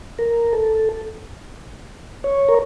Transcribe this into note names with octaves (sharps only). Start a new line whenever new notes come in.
A#4
A4
C#5
A#4